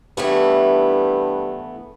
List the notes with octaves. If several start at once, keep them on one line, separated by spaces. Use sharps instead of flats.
G2 E3 A3 B3